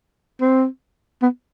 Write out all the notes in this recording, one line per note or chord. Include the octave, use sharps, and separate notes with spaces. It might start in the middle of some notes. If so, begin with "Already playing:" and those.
C4
B3